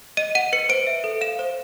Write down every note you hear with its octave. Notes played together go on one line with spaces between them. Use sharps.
D#5 D#7
F#5 D#7
B4 C#7
C5 D7
E5
A4
F5 E7
C5